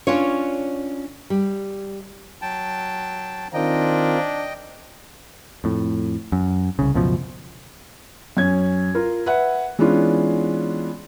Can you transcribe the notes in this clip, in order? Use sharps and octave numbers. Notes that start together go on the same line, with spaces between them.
C#4 D4 F4 C#5
G3
F#3 G5 A5
D#3 C4 D4 F4 A#4 D#5 G5
F2 A2
F#2
C2 C#3
C#2 F#2 B2 F3
F#2 C#4 G#6
F4 A#4
B4 E5 F#5
E3 G#3 B3 C#4 D4 F4